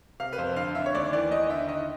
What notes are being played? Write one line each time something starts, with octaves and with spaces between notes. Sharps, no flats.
C3 F5
B4
F2 C5
D3 F5
D3 E5
C#5
D#2 D5
E3 D5
D#2 D#5
D3 E5
D#3 D#5